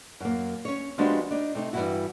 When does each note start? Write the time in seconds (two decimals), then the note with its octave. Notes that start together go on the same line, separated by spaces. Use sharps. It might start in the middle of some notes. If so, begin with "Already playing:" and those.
0.20 F#2 A#3
0.65 C#4 C#5
0.98 F3 G#3 B3 D4 F#4 G4
1.31 D4 D#4
1.55 C3 A3 D#4
1.73 G2 B2 E3 E4 F#4